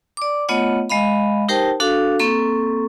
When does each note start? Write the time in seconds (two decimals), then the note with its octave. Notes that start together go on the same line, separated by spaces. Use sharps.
0.17 D5 D6
0.49 A3 B3 F4 C#5 D#5 F#5
0.90 G#3 D#5 F5 B5
1.48 D#4 G4 A#4 C5 G5 A5
1.80 D4 F#4 A4 F5
2.19 A#3 C4 A4 C#6